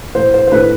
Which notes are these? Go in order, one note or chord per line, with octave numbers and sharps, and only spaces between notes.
A2 C5
C5
C5
A2 B4